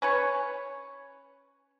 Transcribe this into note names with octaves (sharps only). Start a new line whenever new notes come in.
C#4 B4 C#5